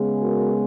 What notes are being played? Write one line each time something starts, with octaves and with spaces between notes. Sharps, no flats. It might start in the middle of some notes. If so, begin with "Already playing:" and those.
Already playing: C#3 G#3 B3
F#4 A#4